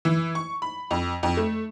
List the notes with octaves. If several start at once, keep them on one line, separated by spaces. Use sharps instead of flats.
E3
C#6
B5
F2
F2
A3